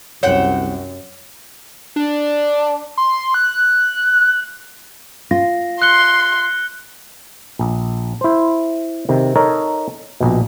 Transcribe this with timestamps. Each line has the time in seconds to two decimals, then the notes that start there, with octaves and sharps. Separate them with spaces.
0.23 C2 F#2 C5 C#5 F#5 G5
1.96 D4
2.97 C6
3.34 F#6
5.31 F4 A#6
5.82 C6 F#6 C#7 G7
7.59 A#1
8.21 E4 C5
9.09 C3 D#3
9.36 D#4 A4 A#4 C#5
10.20 A#1 B2